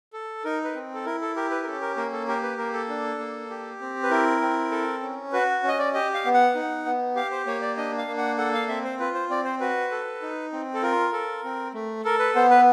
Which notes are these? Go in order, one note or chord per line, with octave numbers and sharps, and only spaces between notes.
A4
D#4 A#4
B4
C4
A4
E4 A#4
A4
G4 A#4
B4
A#4
C#4 A4
A#4
A#3 A#4
A4
G4 A#4
B4
A#3 A#4
A4
D4
A#3
G4
C4
B4
E4 A#4
C4
A4
C#4
F#4 B4
C#4
D#5
D5
G4 D#5
F5
B3
F#5
D#4
B3
G4 F5
C5
A#3 C#5
D5
D4 D#5
F5
A#3
F#5
A4 F#5
F5
C4 E5
C5
F4 B4
C5
C4 D5
C5
F#4 B4
A4
D#4
C4
A4
F4 A#4
A4
C4
A3
A4 A#4
B4
B3 C5
B4